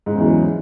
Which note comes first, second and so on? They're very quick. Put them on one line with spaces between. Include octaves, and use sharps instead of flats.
G#2 C#3 E2 E3 F#3